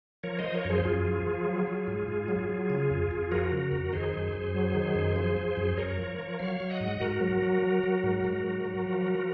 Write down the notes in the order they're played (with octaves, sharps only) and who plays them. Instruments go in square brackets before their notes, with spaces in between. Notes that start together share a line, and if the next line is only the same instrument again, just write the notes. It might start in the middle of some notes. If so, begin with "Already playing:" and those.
[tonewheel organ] F3 A#4 C#5
C5 D#5
F3
A#4 C#5
F#2 G#4 C5
F#2 F4 G#4
F3
F3
F#3
F#3
G#2
G#2
F#3
F#3
C#3
F2
F2
F3 F#4 A#4
C#3
F2
D#3 G#4 C5
F#2
F#2
F#3
D#3
F#2
F3 G#4 C5
F3
F#2
F#2 A#4 C#5
F3
F3
F#3 C#5 F5
F#3
D#5 F#5
G#2
G#2 F#4 A#4
F#3
F#3
F#3
F#3
G#2
G#2
F#3
F#3
F3
F3